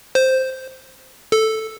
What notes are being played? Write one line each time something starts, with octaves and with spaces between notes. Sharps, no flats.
C5
A4